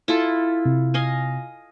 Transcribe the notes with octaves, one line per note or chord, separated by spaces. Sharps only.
E4 F4 A4
C3
D#5 F5 G#5